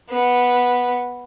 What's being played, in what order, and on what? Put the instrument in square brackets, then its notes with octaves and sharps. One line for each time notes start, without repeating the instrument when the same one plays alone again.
[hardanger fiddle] B3